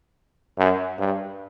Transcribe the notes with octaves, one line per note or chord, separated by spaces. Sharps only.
F#2
G2